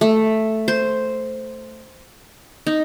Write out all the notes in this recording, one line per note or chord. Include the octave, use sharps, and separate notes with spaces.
A3
C5
D#4